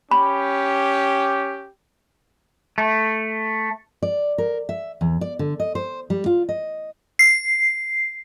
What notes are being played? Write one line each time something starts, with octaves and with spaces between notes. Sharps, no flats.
C#4 G4 B5
A3
D5
A#4
E5
E2
D5
D3
D#5
C5
G3
F4
D#5
C7